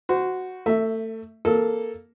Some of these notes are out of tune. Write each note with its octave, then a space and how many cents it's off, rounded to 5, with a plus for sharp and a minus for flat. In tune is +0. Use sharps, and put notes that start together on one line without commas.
F#4 +0 C5 -15
A3 +25 E5 +0
A#3 +0 A4 -5 E6 -40